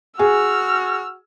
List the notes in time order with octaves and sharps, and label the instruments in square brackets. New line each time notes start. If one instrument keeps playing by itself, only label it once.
[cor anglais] F#4 [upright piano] G#4 [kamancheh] E6 F6